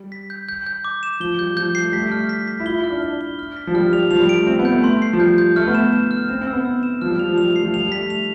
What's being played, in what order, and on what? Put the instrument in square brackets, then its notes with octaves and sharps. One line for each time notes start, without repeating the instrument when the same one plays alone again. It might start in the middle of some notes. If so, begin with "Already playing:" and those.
Already playing: [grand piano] G3
[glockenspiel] B6
G6
G6
G6
D6
E7
[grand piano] F3 [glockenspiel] G7
[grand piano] G3 [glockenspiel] G6
[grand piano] F3 [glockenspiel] G6
[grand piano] G3
[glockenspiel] C7
[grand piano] A3
[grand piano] G3 [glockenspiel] B6
[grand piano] A3
[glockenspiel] F6
B6
B6
[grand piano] E4
[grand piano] F4 [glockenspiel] G7
[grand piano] E4
[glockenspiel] F6
[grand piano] D4
[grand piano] D4 [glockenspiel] G7
[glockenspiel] G7
F6
B6
[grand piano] F3
[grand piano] G3 [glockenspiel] F6
[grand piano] G3 [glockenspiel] F7
[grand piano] F3 [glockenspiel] F7
[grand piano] G3
[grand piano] A3 [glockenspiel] D7
[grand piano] C4 [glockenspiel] D7
[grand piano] B3
[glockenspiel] G6
[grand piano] A3
[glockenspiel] C6
C7
[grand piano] F3
[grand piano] G3 [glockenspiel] G6
[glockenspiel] G6
[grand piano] A3 [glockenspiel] F6
[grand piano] B3
[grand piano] A3 [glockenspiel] E7
[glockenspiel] E7
F6
[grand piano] C4 [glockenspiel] E7
[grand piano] C4
[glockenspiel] E6
[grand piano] B3
[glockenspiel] E6
E7
[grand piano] F3 [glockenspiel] F6
[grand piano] G3
[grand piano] F3 [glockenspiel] F7
[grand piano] F3
[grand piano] G3 [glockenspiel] F7
[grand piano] A3
[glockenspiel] C7
[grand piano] F3
[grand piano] G3 [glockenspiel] F7
[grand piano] G3
[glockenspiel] B6
[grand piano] A3
[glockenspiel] F7